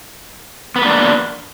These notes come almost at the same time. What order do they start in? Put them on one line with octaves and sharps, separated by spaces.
B3 B4 A#3 D4